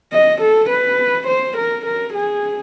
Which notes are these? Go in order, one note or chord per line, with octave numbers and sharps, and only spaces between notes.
D#5
A4
B4
C5
A#4
A#4
G#4